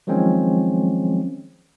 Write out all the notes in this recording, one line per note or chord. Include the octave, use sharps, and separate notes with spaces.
D#3 F3 F#3 G#3 C4 C#4